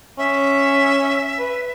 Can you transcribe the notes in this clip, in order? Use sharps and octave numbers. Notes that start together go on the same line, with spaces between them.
C#4 E5
B4